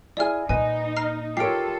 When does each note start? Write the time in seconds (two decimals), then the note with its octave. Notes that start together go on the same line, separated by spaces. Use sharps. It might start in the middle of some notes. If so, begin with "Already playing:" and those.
0.17 E4 G#4 D5 G#5 F6
0.49 A#2 D#4 B4 D#5 G#5
0.96 A#5 F6 C7
1.37 F4 G4 A4 A#4 C#5 C7 D7